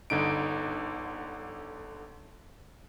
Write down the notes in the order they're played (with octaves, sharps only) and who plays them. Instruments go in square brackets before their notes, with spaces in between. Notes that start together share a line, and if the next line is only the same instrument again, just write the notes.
[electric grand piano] G1 D3 D#4 D7